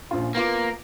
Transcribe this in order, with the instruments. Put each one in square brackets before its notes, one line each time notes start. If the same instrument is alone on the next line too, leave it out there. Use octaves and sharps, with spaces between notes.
[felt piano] A#1 C#4 F4
[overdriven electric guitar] A#3 [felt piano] B3 F4 D6